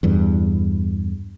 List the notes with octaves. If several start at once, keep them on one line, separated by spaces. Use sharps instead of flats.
E2 G2